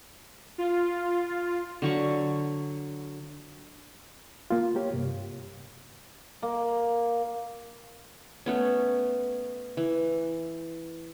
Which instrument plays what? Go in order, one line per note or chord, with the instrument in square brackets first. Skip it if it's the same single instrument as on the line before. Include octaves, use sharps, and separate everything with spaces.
[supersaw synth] F4
[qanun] D3 F#3 C#6
[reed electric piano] A#3 F4
A#3 G4 C#5
G2 C3
[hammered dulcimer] A#3
[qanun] A3 B3 C#4
E3